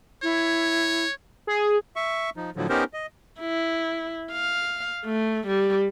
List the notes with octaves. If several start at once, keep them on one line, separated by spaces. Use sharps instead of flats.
E4 C#5
G#4
E5 C#6
F3 D#4
A2 D3 F3 F#3
B3 C#4 D#4 G4 A#4 C5
D#5
E4
F5
A3
G3